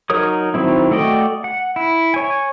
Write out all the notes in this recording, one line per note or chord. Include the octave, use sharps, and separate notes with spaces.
F#3 D#4 A#4 C#5 D#6
D#3 F#3 C4 E4
A3 F#4 D5 D#5 G5
F#5
E4
C#5 G#5